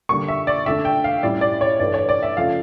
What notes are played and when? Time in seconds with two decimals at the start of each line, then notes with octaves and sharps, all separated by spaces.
0.09 D3 G3 A#3 C#6
0.28 E5
0.47 D5
0.66 D3 A3 D4 E5
0.85 G5
1.04 F5
1.23 A2 G3 C#4 E4 D5
1.41 D5
1.61 C#5
1.80 G2 E3 A3 D5
1.94 C#5
2.09 D5
2.23 E5
2.37 C#3 F3 A3 F5